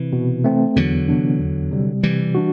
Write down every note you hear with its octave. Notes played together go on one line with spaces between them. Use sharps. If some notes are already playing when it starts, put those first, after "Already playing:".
Already playing: C3 E3
B2
A3 C4
E2 D3 F#3
C3 E3 B3 D4
E2
C3 G3
C3 E3 G3
D4 F#4